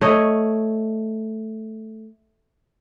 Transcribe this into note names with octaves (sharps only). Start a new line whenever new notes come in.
A3 C#5 D#5